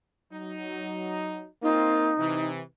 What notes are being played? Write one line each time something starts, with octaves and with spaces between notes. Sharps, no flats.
F#3 D#4
A#3 C4 D#4 F4
C3 E3